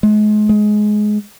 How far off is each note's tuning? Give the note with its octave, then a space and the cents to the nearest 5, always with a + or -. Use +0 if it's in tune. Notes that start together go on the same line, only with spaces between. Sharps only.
G#3 +35
G#3 +15